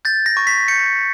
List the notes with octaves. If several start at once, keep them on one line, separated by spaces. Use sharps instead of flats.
G6 A6
A#6
C#6
B6
G6 C#7